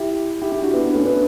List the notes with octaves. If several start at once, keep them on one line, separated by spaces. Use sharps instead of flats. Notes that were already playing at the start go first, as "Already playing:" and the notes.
Already playing: E4 G4
E4 G4
E4 G4
D4 F#4
B3 D4
B3 D4
A3 C#4
B3 D4